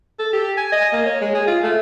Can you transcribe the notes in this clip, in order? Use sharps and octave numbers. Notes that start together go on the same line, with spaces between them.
A4
G4
G#5
D#5
A#3
C#5
G#3
G#4
F4
A3